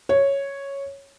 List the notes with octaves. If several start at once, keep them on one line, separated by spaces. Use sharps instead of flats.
C#5